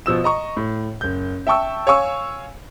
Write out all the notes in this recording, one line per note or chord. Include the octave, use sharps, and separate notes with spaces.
B2 F3 E6 E7
D#5 A#5 C#6
A2
F#1 G6
E5 G5 A5 C#6 E6
C#5 F5 G#5 C#6 E6